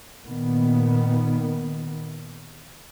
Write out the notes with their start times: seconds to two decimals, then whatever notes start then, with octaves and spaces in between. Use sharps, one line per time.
0.26 A#2 D#3 B3